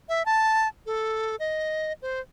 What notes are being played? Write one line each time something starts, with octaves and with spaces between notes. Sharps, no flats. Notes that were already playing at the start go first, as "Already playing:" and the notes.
E5
A5
A4
D#5
C5